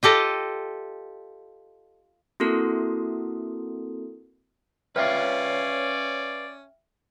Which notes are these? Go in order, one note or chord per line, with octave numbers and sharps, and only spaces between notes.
F4 G4 A4 D#5
A#3 C4 E4 F#4 A4 A#4
C#4 B4 C#5 D5 E5 F5 G5 F6